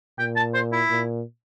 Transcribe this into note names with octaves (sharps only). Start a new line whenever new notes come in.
A#2 G5
A5
C5
E4
A#2